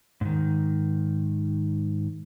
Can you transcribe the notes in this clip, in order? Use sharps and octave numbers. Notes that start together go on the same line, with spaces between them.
G#2 D#3